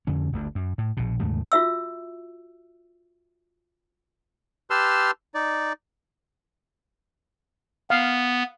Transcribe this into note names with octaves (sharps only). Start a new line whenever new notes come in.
F2 D3 C#4
G1 D2 G2
F#2
A2
A#1 B2
D#2 G#2 C#3 A3
F4 F#4 E5 E6
G4 B4 A5 C6 E6 F6
D#4 D5
B3 F5